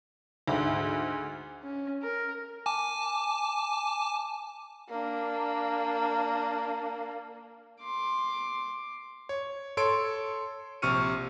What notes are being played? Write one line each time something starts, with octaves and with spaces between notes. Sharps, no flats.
D2 G#2
C#4
A#4
G#5 A5 D6
A#3 D4
C6 D6
C#5
A4 C#5 C6 D7
A#1 C3 C#6 F6 C#7 D#7